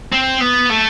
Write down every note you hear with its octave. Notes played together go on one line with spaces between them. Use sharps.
C4
B3
A3